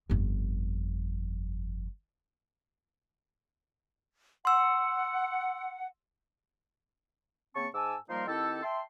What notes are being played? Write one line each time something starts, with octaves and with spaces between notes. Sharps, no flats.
G1 F2
F#5 C6 E6
C#3 A#3 C4 A5 C#6
G#2 G#5 A5 D6 E6
F3 G3 A#3 D#4 A#4 C6
D#3 C4 E4 G4 A4
E5 G5 A5 C6